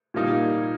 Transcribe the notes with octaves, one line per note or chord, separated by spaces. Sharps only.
A#2 G3 A#3 D#4